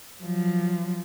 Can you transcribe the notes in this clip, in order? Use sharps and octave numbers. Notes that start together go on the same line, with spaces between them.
F3 F#3